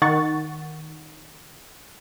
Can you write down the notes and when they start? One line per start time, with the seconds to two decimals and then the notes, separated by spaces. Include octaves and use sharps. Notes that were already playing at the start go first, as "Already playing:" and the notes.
0.02 D#3 F#5 C#6 A6